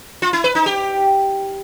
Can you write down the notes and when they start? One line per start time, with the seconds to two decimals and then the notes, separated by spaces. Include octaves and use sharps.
0.22 F4
0.33 E4
0.44 B4
0.55 D#4
0.66 G4